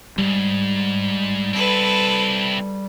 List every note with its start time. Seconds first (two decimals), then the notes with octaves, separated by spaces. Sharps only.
0.18 C2 G#2 G3
1.53 C4 E4 A4 B4